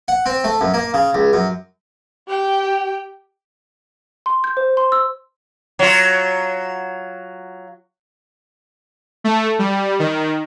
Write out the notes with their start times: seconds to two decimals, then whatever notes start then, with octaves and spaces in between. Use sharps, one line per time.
0.08 F#5
0.26 C4
0.44 A3
0.61 F#2
0.74 A#3
0.94 C#3
1.14 C#2
1.33 F#2
2.28 G4 G5
4.26 C6
4.44 G6
4.57 C5
4.77 C6
4.92 E6
5.79 F#3 F4
9.24 A3
9.59 G3
9.99 D#3